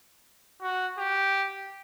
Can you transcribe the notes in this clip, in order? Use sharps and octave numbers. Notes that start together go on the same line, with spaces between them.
F#4
G4